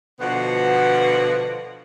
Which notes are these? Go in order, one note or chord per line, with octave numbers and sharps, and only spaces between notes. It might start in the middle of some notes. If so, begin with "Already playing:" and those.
B2 D3 F3 B3 F#4 F#5